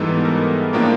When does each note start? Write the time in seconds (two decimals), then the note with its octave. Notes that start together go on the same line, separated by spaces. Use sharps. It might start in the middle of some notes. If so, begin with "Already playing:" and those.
Already playing: G#2 E3 G3 B3 D#4 A4
0.25 A#4
0.73 A2 F3 A#3 D4 F4 A#4